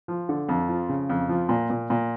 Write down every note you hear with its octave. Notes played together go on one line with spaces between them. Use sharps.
F3
D3
F2
F3
C#3
F2
F3
A#2
A#2
A#2